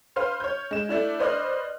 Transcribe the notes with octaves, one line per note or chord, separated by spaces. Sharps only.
B4 C5 F5 C6 F6
C#5 G6
G#3 E7
A3 D4 E4
B4 C5 D5 D#5 F6 F#6